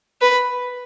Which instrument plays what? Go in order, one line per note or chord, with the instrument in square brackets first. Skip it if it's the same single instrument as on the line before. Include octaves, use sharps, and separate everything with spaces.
[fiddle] B4